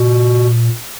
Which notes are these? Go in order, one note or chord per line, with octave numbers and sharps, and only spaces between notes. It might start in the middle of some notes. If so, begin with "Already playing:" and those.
Already playing: A#2 F#4